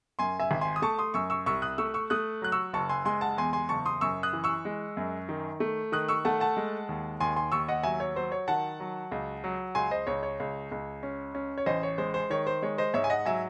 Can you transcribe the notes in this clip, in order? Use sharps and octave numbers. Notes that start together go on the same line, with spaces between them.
F#2 G#5 C6
E5 G#5
G#1
G#5 C6
D#6
A3 A5 C#6
C6 D#6
F#2 C#6 E6
C#6 E6
C2 C#6 E6
D#6 F#6
A3 C#6 E6
C#6 E6
A3 D#6 F#6
F#3 F#6
C#6 E6
F#1 A5 C#6
G#5 C6
G#3 G#5 C6
F#5 A5
E2 G#5 C6
G#5 C6
F#1 A5 C#6
C6 D#6
F#2 C#6 E6
D#6 F#6
E3
C#6 E6
G#3
F#2
D#3
A3
D#3 D#6 F#6
C#6 E6
A3 F#5 A5
F#5 A5
G#3
D#2
D#2 G#5 C6
G#5 C6
D#2 C#6 E6
D#5 F#5
F#3 E5 G#5
C#5
F#3 C5
C#5
D#3 F#5 A5
F#3
C#2
F#3
C#2 G#5 C6
C5 D#5
C#2 C#5
C#5
C#2
C#2
C#4
C#4
C#5
A1 C5 D#5
C#5
G#3 C5
C5
D#3 C#5
C5
G#3 C#5
C5 D#5
G#2 C#5 E5
G#5
D#5 F#5
F#3 E5 G#5